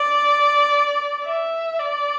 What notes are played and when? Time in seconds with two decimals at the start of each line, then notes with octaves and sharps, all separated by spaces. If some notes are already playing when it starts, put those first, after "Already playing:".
Already playing: D5
1.25 E5
1.79 D5